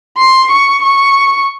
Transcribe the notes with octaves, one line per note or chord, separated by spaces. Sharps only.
C6
C#6
C#6